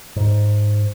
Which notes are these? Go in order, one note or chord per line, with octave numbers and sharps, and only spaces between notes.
G#2